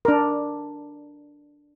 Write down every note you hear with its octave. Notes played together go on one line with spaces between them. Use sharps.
D4 A#4